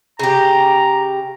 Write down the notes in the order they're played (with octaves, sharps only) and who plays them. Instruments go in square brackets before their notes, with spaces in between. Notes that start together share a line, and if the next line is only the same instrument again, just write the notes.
[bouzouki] C#3 G4 [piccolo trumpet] A#5